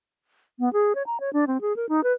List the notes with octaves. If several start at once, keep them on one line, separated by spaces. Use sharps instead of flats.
B3
G#4
C#5
A#5
C#5
D4
C4
G#4
A#4
D#4
B4